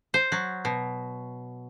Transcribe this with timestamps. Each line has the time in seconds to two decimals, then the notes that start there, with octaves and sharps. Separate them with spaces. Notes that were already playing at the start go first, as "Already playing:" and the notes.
0.14 C5
0.32 F#3
0.65 B2